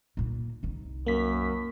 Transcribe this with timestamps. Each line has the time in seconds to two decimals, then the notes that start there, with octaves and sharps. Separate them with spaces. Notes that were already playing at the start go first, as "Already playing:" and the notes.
0.17 A#2 A#3
0.63 C2 D#4
1.06 F#2 A#3 B6